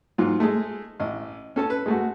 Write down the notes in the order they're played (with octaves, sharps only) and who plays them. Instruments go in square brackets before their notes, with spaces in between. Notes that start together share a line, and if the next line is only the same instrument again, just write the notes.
[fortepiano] G#2 F#3 F4
G#3 A3
A1 D#5
C#4 A4 A5
B4
G#3 A3 F#4